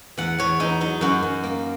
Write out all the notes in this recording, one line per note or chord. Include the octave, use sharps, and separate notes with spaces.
E2 F#5
E2 C#5
E2 D#4
F#3 D#4
F#2 F#4
F#2
A#3